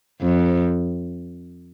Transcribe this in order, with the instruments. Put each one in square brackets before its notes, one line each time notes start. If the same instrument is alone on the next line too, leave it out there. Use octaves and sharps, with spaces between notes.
[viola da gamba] F2